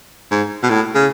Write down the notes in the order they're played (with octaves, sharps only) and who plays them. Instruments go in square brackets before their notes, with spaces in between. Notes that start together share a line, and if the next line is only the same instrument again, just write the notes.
[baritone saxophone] G#2
B2
A2
C#3